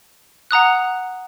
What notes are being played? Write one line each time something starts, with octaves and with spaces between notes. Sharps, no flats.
F#5 A#5 D#6 F#6